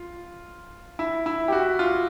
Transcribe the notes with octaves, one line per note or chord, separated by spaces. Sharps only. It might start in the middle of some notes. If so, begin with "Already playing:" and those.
Already playing: F4
E4
E4
G4
F#4
F4